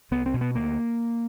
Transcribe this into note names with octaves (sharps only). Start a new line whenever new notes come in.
C2 B3
C4
B2
B3
D2 A#3